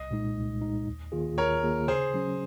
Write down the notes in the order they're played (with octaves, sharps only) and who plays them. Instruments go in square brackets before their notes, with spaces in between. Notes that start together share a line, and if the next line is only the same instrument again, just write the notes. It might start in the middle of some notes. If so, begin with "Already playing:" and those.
Already playing: [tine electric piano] C2 [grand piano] D#5
[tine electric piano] A#2 G#3 D#4
C2
A#2 G#3 D#4
D#2
D#3 A#3 F4 G#4
[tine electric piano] D#2 [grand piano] A#4 C#5
[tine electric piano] D#3 A#3 F4 G#4
[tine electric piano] C#3 [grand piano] G#4 C5
[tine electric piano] F#3 C#4